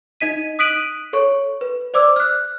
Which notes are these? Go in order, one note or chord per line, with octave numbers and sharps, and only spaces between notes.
D#4 D#5 B6 D#7
D#6 F#6 B6 D7 D#7 F#7
A4 C#5 C#6
B4
C5 D5 D6 E6
F6 F#6